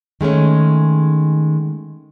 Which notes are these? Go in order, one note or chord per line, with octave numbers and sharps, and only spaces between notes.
D#3 G#3 A3 C#4